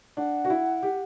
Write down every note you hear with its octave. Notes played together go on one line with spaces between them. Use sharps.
D4 F#5
F#4
E4
G4